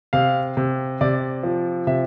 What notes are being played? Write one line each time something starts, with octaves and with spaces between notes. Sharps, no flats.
C3 F5
C3
C3 D5
F3
C3 E5